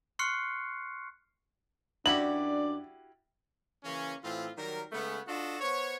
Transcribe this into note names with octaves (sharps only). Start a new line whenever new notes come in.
C6 C#6 F6 F#6 C7 C#7
F#2 D4 E4 F#4 G4 D5 F#7
C#3 E3 A#3 C#4
A2 E3 C4 F4
D#3 F#3 G3 A#4
C#3 G#3 A3 B3
D4 F4 F#4 A4 D#5
B3 C5 C#5